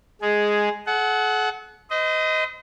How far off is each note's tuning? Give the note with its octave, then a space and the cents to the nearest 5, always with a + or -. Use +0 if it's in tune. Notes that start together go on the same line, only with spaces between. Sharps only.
G#3 +0 G#4 +5
A4 -45 F#5 +5
C5 -40 D#5 +10